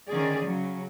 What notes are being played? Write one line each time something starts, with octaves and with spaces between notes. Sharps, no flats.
D3 D#3 C#4 G#4 D5
C#3 F#3